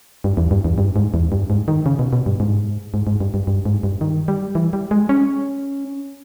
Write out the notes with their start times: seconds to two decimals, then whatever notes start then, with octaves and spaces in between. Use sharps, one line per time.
0.24 G2
0.37 E2
0.51 G2
0.64 E2
0.78 G2
0.96 G#2
1.14 E2
1.32 G2
1.50 G#2
1.68 D#3
1.86 C#3
1.99 B2
2.13 B2
2.26 G2
2.40 G#2
2.94 G#2
3.07 G#2
3.20 G2
3.34 G2
3.47 G2
3.65 G#2
3.83 G2
4.01 D#3
4.28 G3
4.55 E3
4.73 G3
4.91 G#3
5.09 C#4